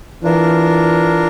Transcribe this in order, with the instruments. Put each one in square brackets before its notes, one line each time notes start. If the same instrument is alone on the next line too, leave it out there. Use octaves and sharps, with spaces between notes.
[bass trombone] E3 [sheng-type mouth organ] D4 F4 A#4